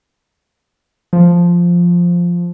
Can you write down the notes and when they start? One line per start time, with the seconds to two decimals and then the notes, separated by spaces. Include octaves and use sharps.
1.13 F3